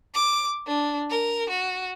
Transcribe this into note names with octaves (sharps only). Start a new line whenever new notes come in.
D6
D4
A#4
F#4